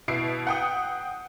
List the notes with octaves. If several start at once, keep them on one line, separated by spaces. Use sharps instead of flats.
B2 E4 C7 D7
F#5 G5 D#6